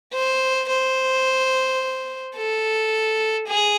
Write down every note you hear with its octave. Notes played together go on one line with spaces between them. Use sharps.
C5
C5
A4
G#4